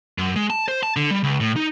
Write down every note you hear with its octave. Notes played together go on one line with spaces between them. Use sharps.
F#2
G#3
A5
C5
A5
D3
G3
C#2
A2
D#4